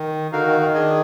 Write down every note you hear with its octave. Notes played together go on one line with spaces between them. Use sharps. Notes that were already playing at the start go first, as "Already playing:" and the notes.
Already playing: D#3
D3 D#4 F#4 A#4 F5
D#3
D#3
D4 G#4 D#5 G#5